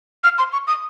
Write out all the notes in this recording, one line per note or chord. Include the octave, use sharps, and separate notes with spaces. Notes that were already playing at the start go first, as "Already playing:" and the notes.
F6
C6
C#6
D#6